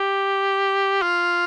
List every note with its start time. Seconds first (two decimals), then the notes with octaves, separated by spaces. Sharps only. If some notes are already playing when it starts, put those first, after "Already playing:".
Already playing: G4
1.02 F4